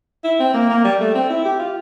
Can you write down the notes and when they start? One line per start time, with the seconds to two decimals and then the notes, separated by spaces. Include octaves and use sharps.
0.24 E4
0.40 C4
0.54 A#3
0.70 A#3
0.84 G3
1.00 A3
1.15 C4
1.30 E4
1.45 G4
1.59 F4